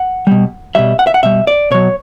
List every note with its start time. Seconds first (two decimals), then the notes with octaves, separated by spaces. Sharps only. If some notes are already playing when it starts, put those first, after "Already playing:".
Already playing: F#5
0.27 B2 G3
0.75 B2 G3 E5
0.99 F#5
1.07 E5
1.14 F#5
1.23 B2 G3 E5
1.47 D5
1.71 B2 F#3 C#5